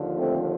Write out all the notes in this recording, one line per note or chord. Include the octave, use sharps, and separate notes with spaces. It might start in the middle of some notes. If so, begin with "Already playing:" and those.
Already playing: D#2 D3 F3
A3 C4